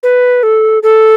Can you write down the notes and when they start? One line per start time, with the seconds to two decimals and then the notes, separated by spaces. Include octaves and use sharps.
0.03 B4
0.43 A4
0.83 A4